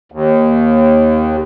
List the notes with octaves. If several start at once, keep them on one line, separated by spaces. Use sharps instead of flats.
D#2